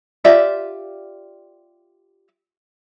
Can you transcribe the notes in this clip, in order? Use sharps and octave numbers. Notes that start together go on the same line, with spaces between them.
F4 G4 D5 E5